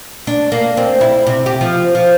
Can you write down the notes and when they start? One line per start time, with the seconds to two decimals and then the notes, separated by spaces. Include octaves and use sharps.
0.27 D4
0.52 A#3
0.77 C4
1.01 E4
1.27 C3
1.46 G4
1.61 F3
1.95 F3